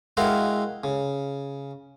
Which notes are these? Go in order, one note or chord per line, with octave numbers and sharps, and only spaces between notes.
G#3 E4 F#4 A#4 F5 G5
C#3